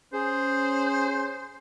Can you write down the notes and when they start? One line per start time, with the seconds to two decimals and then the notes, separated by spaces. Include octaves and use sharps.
0.13 C#4 G#4 C5